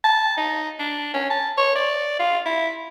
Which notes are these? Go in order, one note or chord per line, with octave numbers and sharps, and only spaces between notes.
A5
D#4
D4
C#4
A5
C#5
D5
F4
E4